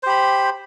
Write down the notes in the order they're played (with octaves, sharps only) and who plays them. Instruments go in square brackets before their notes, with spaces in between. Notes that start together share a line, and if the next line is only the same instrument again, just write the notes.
[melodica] C5
G4
B5